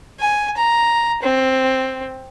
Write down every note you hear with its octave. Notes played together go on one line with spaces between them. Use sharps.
G#5
A#5
C4